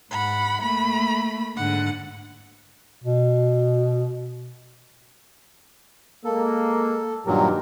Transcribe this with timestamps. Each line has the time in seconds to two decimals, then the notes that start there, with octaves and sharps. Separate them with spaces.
0.11 G#2 F#5 B5
0.63 A3 A#3 B5
1.57 G#2 D3 F#5
3.04 B2
6.25 G#3 A#3 A4
7.26 G2 A#2 D#3 F#3 G4 A#4